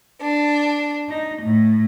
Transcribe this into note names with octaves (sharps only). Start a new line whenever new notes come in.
D4
D#4
A2